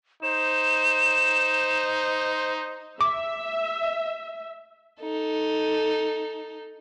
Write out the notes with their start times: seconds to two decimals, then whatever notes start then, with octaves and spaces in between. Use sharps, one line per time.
0.23 D#4 C5 E7
3.01 E5 D6
5.01 D#4 A4